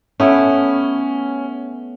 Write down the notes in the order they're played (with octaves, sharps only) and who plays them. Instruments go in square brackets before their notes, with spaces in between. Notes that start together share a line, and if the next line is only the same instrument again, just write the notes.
[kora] A3 B3 E4 [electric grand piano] C#4